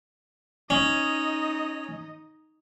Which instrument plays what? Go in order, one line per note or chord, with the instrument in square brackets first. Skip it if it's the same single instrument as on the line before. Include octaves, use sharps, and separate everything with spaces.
[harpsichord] C#4 [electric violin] D#4 D#5